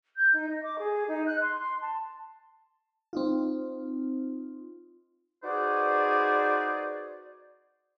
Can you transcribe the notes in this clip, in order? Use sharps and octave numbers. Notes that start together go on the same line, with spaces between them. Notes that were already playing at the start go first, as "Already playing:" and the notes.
G6
D#4
D#5
D6
G#4
D#4
F#6
C6
C6
A5
C4 D#4 F4
D#4 F#4 G#4 B4 C5 D5